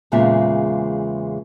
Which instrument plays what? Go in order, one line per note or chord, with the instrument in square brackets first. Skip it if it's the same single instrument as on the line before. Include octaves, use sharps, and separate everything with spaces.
[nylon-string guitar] E2 A#2 C#3 G#3 F4 E5